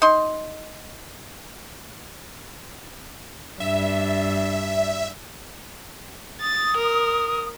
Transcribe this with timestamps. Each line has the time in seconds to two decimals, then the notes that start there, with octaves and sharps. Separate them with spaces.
0.02 D#4 C6
3.60 G2 D4 E5
6.41 D#6 A6
6.77 A#4